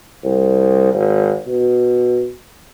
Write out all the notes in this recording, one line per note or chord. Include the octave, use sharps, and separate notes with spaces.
C2
G#1
B2